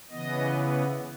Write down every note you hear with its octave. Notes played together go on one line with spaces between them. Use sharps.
C#3 E3 B3 D#5